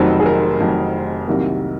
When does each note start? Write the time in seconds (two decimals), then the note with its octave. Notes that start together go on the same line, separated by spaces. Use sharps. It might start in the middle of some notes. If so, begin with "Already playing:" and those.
Already playing: F1 F2 D#3 F#3 C5
0.20 G#4
0.26 A#4
0.59 F1 F2 D#3 F#3
1.27 C2 C3 D#3 F#3 A#3